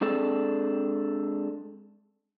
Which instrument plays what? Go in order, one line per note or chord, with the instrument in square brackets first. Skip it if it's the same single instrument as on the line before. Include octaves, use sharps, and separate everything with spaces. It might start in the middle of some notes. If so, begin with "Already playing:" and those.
[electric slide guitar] G#3 C4 D4 G#4 A4